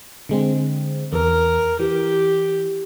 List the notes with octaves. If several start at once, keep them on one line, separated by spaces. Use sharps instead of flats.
D3 G#3 C4
E2 A#4
E3 G4